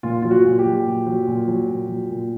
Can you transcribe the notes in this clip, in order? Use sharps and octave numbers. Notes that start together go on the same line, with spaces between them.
A#2 F4
F#3 F4
F#4
A#2
G4
F#3
A#2
F#3
A#2
F#3
A#2
F#3
A#2